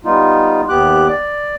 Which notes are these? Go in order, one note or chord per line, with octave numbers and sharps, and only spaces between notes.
G3 B3 D#4 F4
D#2 B3 G4 D6 F#6
D5